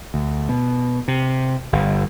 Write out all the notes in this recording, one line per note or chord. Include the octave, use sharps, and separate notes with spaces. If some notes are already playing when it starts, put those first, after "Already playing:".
D2
B2
C3
G1